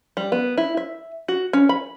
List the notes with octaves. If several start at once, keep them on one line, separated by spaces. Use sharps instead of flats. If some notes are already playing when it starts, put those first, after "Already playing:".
G3
B3
E4
E5
F#4
C#4
B5